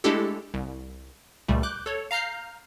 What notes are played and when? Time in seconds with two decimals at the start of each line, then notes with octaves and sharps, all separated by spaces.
0.04 G#3 A3 D4 E4 G4 A4
0.54 C2
1.48 C#2 A#2 G3 A3
1.63 D6 F#6 G6
1.86 A4 C#5
2.11 F5 A#5 F6 G6 C7